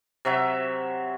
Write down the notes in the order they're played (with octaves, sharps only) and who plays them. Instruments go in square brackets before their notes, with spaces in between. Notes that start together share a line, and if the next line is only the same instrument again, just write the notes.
[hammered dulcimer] C3 F#3 E5